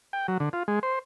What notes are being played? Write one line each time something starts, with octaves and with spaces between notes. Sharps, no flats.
G5
F#3
D3
F4
G#3
C5